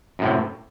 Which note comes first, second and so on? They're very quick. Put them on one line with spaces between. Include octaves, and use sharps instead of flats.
F#2 A2 C3